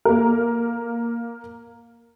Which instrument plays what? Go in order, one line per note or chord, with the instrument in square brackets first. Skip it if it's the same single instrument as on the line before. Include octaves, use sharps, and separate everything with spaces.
[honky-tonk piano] A#3 A#4